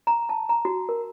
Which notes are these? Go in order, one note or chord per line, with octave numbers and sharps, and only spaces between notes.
A#5
A5
A#5
F#4
A#4